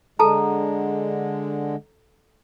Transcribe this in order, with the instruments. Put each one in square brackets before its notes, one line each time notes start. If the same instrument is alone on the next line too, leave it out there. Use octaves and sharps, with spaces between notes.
[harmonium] D3 G#3 [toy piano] A4 A5 A#5